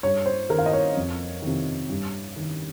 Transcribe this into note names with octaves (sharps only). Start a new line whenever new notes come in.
G2 C#5
C5
D#3 A#4
F5
D#5
C#5
F2
C3 D#3
G2
D#3